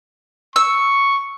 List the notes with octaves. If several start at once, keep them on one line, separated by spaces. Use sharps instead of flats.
C#6 E6